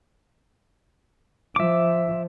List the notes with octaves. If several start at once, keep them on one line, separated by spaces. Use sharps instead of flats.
F3 E5 D6